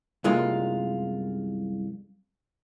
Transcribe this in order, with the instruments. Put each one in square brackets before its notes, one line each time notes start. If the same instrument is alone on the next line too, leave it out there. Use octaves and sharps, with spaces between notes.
[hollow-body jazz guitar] C2 F#2 G#3 A#3 F4